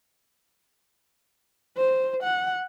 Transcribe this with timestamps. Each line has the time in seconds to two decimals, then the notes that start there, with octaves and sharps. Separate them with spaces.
1.77 C5
2.23 F#5